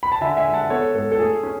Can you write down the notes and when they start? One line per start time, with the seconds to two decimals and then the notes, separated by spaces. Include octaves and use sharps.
0.03 B5
0.12 A5
0.21 D3 E5 G#5
0.37 E5 G#5
0.46 G#3
0.54 F#5 A5
0.70 B3 A4 C#5
0.94 G#2 A4
1.12 A4
1.19 A3 G#4
1.43 C#4